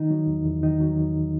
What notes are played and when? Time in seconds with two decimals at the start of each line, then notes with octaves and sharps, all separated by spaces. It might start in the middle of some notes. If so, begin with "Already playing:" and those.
Already playing: D#3 D#4
0.11 F#3
0.27 E2
0.45 E2
0.63 D#3 D#4
0.81 F#3
0.98 E2